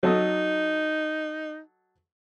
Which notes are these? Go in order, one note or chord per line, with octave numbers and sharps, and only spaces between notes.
F#3 D#4 A4 D#5